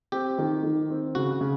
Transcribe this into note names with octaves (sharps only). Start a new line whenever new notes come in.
C4 G4
D#3
D#3
C4
C#3 F#4
C#3